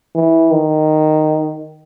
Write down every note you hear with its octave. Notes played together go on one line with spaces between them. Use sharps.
E3
D#3